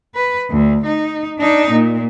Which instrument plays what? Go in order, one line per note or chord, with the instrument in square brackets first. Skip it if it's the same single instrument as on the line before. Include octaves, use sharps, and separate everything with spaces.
[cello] B4
D2
D#4
D4 D#4
A#2